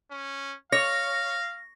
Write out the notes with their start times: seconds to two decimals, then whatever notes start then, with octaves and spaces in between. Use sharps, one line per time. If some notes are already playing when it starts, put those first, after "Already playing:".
0.11 C#4
0.72 C#5 F5 A#6